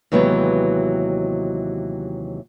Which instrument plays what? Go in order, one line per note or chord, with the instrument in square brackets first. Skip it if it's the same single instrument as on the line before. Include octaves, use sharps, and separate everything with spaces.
[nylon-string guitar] D#2 C3 E3 F#3 G#3 B3